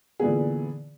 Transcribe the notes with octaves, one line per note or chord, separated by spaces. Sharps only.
A#2 D3 E3 B3 G#4